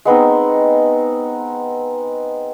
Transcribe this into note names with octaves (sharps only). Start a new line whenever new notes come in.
G#3 B3 C4 D#4